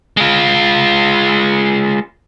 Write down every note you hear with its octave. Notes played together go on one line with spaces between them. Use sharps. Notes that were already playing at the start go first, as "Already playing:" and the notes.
G#3 F4